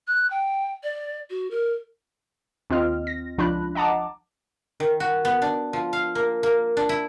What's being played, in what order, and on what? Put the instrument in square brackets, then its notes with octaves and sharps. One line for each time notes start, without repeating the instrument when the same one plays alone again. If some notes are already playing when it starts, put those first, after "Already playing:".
[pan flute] F#6
G5
D5
F#4
A#4
[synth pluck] D#2 C4 F4 D#5 F6
A#6
C#2 F3 D4 F4 B5 F#6
D#5 F#5 A5 A#5 D6
[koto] D#3
F#4
B3
D4
F3
F5
A#3
A#3
D4
E4